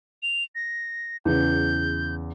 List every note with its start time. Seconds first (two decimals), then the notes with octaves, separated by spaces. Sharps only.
0.23 F7
0.55 A#6
1.25 E2 C#3 G6